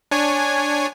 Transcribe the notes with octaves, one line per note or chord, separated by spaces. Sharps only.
D4 C#5 G#5